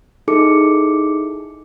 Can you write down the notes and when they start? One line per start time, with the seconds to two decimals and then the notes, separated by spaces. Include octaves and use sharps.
0.28 D#4 E4 G#4 A4 D6 C#7